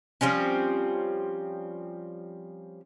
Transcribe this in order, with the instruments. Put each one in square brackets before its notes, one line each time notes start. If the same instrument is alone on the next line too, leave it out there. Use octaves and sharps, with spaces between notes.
[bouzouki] F3 G3 C4 C#4